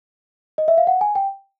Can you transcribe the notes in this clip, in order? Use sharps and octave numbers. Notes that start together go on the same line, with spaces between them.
D#5
E5
F5
F#5
G#5
G5